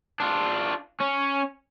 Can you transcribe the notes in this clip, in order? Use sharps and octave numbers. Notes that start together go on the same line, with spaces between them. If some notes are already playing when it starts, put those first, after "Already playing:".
D4 F4
C#4